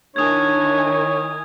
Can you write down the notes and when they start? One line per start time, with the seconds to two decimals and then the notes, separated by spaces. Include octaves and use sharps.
0.16 D#3 D4 E4 C#5 G#5 D#6 G#6